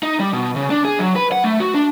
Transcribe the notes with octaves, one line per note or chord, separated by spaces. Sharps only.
D#4
G3
B2
C#3
D4
G#4
F#3
B4
F#5
A3
F#4
D4